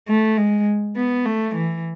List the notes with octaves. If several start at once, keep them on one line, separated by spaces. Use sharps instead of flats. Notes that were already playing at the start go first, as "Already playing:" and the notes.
A3
G#3
B3
A3
E3